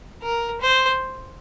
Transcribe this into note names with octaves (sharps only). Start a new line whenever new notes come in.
A#4
C5